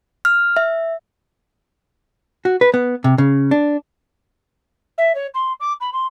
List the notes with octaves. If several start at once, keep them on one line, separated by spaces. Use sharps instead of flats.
F6
E5
F#4
B4
B3
C3
C#3
D4
E5
C#5
C6
D6
B5
C6